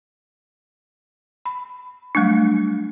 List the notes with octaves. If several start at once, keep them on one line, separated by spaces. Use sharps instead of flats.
B5
F#3 G3 A3 D4